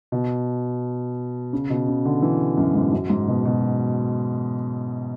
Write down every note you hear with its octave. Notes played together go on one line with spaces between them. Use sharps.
B2
C#3
B2
C#3
D3
E3
F#2
G#2
F#2
G#2
B2
B2